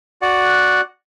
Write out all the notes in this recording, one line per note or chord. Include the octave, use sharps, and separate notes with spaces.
F#4 D5 F#5